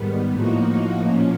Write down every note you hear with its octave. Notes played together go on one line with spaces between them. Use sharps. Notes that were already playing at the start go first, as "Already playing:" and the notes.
Already playing: G#2 D#3 G3 B3
A2 F3 A#3 D#4 F#4
A#2 F3 A#3 C#4